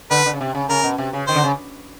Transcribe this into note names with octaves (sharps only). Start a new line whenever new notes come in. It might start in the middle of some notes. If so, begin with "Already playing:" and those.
D3 B4
D3
C#3
C3
C#3
C#3 A#4
B2
C3
C#3
D#3 C5
D3
C#3